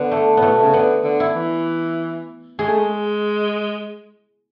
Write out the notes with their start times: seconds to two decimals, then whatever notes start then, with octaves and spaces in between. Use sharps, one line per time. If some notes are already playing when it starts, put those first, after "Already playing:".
Already playing: D3 B3
0.12 A3
0.37 A2 A3 B3
0.51 B2
0.62 C#3
0.73 D3 B3
1.04 D3
1.20 E4
1.35 E3
2.59 G#3 G#4
2.68 A3
2.78 G#3